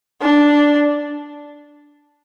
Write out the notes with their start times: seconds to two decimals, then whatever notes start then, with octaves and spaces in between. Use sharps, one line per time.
0.22 D4